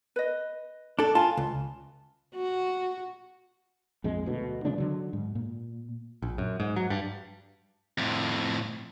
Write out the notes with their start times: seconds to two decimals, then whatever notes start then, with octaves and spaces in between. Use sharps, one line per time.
0.16 B4 D#5
0.99 D4 A4
1.15 F4 G#5 A5
1.37 C#2
2.35 F#4
4.04 A#1 F2 G#3
4.26 D2 B2
4.65 C#3 F3 G#3 D4
4.78 D3 F#3
5.13 G#2
5.35 A#2
6.22 A#1
6.38 F#2
6.60 G#2
6.76 F#3
6.90 G2
7.98 F2 A2